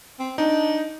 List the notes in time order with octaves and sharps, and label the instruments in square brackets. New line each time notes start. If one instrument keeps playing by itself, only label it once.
[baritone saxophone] C4
[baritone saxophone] D4 [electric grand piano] D#4